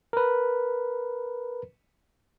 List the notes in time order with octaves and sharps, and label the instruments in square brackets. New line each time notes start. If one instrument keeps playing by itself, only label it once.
[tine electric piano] A#4 B4